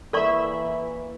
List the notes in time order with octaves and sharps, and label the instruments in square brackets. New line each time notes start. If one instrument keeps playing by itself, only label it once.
[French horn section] E3 A#3 [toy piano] A4 D5 C#6 [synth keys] E5 B5